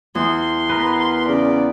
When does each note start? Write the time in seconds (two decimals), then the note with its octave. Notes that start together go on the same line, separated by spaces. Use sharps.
0.15 E2 C6
0.70 B3 A#4 B4
1.28 C#3 D5